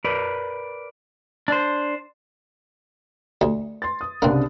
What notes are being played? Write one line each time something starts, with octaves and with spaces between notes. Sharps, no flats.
A#4 B4 D5
D4 C5
D2
C6 A6
D#6
C2 C#3 A#3 C4 D4